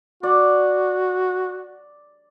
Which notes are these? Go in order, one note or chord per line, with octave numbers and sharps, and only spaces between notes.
F#4 D5